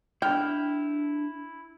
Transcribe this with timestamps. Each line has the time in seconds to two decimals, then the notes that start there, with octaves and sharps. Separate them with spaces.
0.22 D4 E4 G5 F6